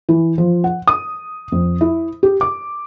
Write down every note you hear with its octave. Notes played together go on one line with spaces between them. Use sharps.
E3
F3
F#5
D#6
F2
E4
G4
D6